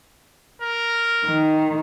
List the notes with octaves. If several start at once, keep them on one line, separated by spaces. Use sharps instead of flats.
A#4
D#3